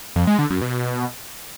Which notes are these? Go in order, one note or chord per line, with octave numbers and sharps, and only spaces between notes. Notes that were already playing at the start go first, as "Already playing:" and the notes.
F2
G#3
D3
F#2
B2